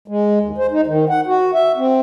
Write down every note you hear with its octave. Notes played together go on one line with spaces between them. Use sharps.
G#3
D#2
C5
D#4
D#3
F#5
F#4
E5
C4